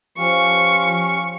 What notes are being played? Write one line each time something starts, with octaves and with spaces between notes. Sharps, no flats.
F3 C#4 G4 F5 C#6